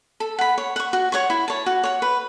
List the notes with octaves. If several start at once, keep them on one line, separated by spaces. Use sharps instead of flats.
A4
F#5 B5
C#5
F#5 C#6
F#4
C#5 F#5 C#6
E4
C#5 A5
F#4
C#5 F#5
B4